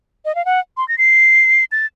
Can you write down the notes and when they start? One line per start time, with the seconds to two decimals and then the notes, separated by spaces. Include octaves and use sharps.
0.25 D#5
0.35 F5
0.45 F#5
0.77 C6
0.88 A#6
0.98 C7
1.72 A6